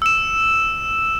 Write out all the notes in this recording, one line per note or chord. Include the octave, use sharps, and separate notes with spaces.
E6 E7